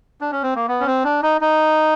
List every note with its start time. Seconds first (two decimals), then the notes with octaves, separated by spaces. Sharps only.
0.21 D4
0.32 C#4
0.43 C4
0.55 A#3
0.68 B3
0.80 C#4
0.87 C4
1.04 D4
1.23 D#4
1.41 D#4